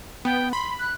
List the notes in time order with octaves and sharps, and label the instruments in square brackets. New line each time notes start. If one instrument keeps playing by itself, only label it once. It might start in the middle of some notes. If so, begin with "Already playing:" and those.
[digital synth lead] B3 [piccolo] G5
[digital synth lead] B5 [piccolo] C6
[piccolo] F#6